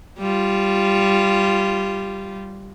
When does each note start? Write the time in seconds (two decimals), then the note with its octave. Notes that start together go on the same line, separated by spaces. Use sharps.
0.19 G3 F4